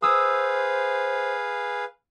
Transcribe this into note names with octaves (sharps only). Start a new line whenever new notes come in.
G#4 B4 C5 F5 D#6 E6